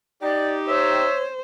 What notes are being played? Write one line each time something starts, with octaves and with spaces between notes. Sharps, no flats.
D#4 G4 D5
C5 C#5 E5